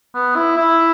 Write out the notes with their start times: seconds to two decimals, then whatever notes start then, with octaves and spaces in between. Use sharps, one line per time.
0.15 B3
0.36 E4
0.57 E4